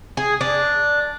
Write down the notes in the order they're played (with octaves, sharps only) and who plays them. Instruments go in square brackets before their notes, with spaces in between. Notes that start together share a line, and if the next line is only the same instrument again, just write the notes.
[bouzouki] G#4
D4